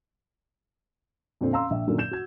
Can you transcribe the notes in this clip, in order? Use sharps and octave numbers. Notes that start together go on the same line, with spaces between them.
F2 A#2 D3 C4
C#4 F5 A#5 C6 E6
A#1 E5
F#2 A#2 D3 D#3 F#3 A#3
G6 E7
F#4 G#6